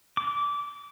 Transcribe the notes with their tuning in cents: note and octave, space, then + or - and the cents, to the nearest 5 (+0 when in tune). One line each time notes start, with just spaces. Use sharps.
D6 -20